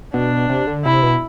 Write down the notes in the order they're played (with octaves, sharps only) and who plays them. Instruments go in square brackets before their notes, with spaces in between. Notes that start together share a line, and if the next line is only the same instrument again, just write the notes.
[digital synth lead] B2 [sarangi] D4
[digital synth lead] C3
D3
[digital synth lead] C3 [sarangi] E4
[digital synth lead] B2